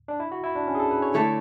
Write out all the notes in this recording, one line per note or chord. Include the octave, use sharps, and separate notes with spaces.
D4
E4
F#4
E4
D4
C#4
G#4
A4
B4
C#5
D3 A3 E4 A4 C#5